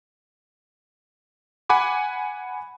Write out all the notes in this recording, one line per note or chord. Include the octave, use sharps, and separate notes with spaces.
F#5 G#5 B5 D6